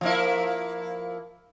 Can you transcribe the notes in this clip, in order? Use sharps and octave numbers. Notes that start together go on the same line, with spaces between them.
F3 A#3 E4